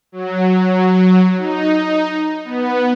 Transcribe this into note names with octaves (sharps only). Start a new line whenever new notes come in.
F#3
D#4
B3